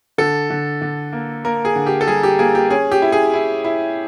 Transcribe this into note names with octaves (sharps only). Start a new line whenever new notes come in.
D3 A4
D3
D3
A#3
A#3 A#4
G#4
D3
G4
A4
G3 G#4
G4
A#3 G#4
G4
C#4 G#4
G4
E4
G#4
E4
E4